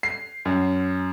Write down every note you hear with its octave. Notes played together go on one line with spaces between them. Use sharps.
C7
F#2